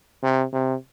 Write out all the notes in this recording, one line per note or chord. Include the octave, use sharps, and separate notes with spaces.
C3
C3